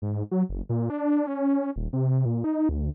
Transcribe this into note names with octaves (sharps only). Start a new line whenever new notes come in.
G#2
F#3
F#1
A#2
D4
C#4
D#1
C3
A#2
D#4
D2